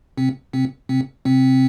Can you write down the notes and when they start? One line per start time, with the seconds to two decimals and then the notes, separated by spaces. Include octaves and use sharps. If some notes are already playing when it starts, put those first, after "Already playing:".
0.18 C3 C4
0.53 C3 C4
0.89 C3 C4
1.25 C3 C4